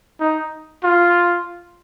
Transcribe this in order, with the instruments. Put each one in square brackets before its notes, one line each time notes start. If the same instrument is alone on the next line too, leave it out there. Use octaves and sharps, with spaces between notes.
[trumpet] D#4
F4